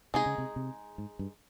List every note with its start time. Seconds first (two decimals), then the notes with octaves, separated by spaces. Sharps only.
0.14 C3 G#3 D#4 G#4
0.26 C#3
0.38 C3
0.56 C3
0.98 G#2
1.19 G2